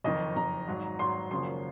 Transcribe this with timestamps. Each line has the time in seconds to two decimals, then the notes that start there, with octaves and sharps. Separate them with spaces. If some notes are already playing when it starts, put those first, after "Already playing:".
0.04 F#1 F2 D#3 D#5
0.36 F#1 F2 D#3 A#5
0.68 G#1 G#2 F#3
0.99 G#1 G#2 F#3 C6
1.31 G#1 F#2 C#3 F3 A#3 C6